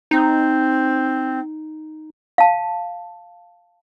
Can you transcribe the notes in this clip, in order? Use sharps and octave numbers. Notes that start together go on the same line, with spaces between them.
C4 D#4
F5 A5